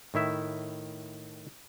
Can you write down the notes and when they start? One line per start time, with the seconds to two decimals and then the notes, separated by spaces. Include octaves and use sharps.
0.14 A2 D#3 E4 E5